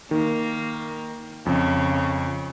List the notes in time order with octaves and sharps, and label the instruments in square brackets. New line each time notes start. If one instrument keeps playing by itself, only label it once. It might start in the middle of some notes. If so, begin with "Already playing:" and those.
[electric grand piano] D#3 [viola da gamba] A#3
[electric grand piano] F2 [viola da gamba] C#3